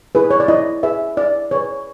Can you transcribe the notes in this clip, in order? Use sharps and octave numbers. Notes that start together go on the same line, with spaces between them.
E4 G#4 B4
C#5
D5
E4 D#5
G#4 B4 E5
E4 D5
G#4 B4 C#5